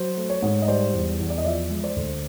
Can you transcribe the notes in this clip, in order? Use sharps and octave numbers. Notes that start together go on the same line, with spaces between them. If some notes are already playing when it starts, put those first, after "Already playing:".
Already playing: F#3 C5
A3
C#5
G#2
D#5
G3 C5 D5
E2
E2
D5
D#5
F3 D5 E5
G#3
C5 D5
D2